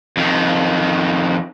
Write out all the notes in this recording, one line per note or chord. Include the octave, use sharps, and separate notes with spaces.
F2 D#3